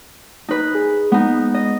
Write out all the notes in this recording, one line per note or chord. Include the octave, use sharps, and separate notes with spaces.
D#4 B4
G#4
G#3 B3 D#4
D#5